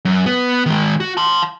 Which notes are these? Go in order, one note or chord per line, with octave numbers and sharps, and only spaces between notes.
F#2
B3
D#3 G#3
F#4
A5 C6